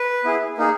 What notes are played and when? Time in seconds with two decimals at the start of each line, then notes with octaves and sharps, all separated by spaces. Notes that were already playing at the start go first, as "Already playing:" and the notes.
Already playing: B4
0.24 B3 E4 G#4
0.58 A#3 D#4 G#4